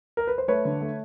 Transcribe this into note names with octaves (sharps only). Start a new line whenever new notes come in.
A#4
B4
C5
A3 B4 C#5
D3
A3